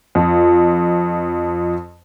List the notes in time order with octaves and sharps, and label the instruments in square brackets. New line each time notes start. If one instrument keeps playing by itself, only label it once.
[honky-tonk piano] F2 F3